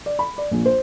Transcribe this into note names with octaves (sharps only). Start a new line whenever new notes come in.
D5
B5
D5
A#1
C5